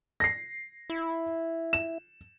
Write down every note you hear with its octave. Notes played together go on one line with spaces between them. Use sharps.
A#6 C7
E4
E7